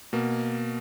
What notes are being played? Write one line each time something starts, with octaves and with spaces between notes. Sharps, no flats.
B2 A#3